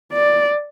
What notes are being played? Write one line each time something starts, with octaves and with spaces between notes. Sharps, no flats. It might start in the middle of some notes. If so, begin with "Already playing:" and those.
D5